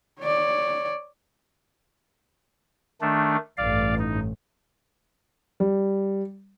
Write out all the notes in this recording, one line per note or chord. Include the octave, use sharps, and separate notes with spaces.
C#5 D5
D#3 A3 D4
A1 G2 D5 F5
D#4
G3